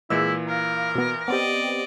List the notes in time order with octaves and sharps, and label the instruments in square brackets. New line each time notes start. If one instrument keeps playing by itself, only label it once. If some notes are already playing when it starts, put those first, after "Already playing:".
[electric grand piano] A#2 E3 E6 [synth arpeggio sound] G#3 [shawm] E4
[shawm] A#4 [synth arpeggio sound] F5
[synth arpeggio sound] B2 B3
[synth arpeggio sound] B3 C4 G4 [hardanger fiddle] D5 D#5